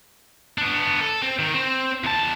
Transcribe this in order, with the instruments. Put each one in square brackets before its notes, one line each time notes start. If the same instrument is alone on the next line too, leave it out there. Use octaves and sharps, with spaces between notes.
[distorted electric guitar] B3 D4
A4
C4
D#3
C4
E2 A5